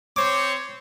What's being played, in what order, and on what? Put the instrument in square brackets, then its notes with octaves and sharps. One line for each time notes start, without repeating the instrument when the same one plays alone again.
[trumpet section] C4 C5 C#5 [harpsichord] D6